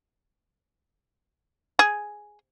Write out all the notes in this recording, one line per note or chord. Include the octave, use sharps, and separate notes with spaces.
G#4